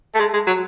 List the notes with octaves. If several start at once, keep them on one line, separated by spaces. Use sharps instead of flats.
A3
G#3
G#3
F#3